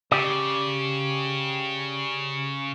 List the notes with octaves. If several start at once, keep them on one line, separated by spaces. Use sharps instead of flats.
C#3 G4 D5